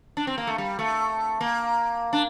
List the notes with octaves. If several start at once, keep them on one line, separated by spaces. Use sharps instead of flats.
D4
C4
A#3
A3
G3
A3
A#3
D4